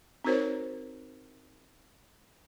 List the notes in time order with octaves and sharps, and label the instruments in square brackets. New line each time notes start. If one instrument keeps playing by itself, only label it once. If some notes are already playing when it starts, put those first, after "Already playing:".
[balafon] C4 D#4 F#4 A#4 C5 C#5